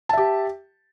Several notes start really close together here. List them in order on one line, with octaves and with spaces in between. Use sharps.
A5 E5 G4